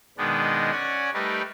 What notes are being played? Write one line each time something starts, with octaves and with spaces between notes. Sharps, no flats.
B2 D#3 G#3 B3 D4
C#4 D5 F#5 G#5
G3 A3 D#4 G4 A#4 B4